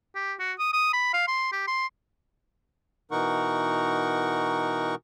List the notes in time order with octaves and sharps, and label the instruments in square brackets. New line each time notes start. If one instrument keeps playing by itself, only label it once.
[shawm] G4
F#4
D#6
D#6
B5
F5
C6
G4
C6
[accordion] B2 E3 D#4 A#4 F#5 C#6